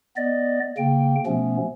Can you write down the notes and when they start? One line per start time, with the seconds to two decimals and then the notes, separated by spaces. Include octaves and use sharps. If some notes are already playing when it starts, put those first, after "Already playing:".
0.16 B3 D5 D#5
0.77 C#3 A#3 G5
1.26 B2 F3 A3 B3 C#4